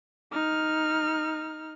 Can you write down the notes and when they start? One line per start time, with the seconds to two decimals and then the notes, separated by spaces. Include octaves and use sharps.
0.32 D#4 F6